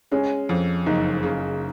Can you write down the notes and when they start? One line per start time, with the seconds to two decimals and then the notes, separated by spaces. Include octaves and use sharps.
0.12 G#3 C#4
0.49 F2
0.86 F#1 D#4
1.23 C#3